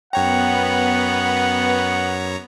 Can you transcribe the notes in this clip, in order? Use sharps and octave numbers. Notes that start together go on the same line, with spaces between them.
F#2 B3 C#5 F#5 G5 A#5